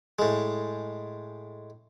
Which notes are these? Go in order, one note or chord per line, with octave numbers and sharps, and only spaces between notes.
A2 G#3